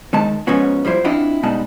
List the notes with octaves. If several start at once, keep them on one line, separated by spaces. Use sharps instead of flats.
D#3 G#3 A5
G#2 F3 B3 C#4 F#4
F3 G3 E4 C5
C4 D4 E4 F4 D#5 F#5
B2 G3 G#3 D#4 F#5 A5